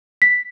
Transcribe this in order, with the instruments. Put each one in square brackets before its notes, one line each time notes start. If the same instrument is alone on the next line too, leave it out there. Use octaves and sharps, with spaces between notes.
[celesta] B6